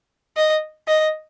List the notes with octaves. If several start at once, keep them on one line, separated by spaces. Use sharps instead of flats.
D#5
D#5